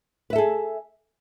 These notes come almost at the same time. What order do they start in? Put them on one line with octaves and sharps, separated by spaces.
B4 E5 A4 G#4